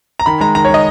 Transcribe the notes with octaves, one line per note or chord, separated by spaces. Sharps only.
A#5
D#3 B5
G#3 A#5
D#3 A#5
C#5
G#3 D#5